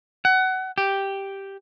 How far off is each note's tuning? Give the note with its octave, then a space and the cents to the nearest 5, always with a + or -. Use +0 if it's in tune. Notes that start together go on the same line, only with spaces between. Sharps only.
F#5 +25
G4 +0